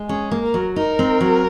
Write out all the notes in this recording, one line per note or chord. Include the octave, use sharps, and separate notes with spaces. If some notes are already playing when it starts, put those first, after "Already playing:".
Already playing: G#3
C#4 G#4
A#3
A#4
F#3
D#4 A#4
C4
F#3